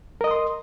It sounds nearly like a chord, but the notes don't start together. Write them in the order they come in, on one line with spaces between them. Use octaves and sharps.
A#4 D#5 D#6 C6